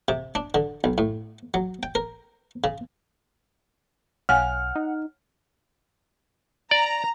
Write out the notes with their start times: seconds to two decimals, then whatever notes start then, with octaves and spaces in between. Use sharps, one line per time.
0.08 C3
0.35 D4
0.54 D3
0.84 B1
0.98 A2
1.54 F#3
1.83 G5
1.95 A#4
2.64 C#3
4.29 B1 C#5 F5 F#5 G#5 F6
4.76 D#4
6.71 D5 A#5